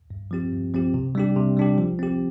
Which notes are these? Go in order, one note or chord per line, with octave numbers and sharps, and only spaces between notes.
G2
F3 C4 G4
G2
F3 C4 G4
C3
G3 D4 G4
C3
G3 D4 G4
F3
C4 G4